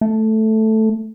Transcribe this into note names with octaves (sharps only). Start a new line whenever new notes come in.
A3